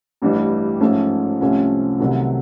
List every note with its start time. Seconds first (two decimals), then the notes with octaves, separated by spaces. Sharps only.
0.22 A1 G2 E3 G3
0.81 G#2 F3 A3 C#4
1.40 C2 C3 F3 A3 C#4
1.99 C2 C3 D#3 F#3 A3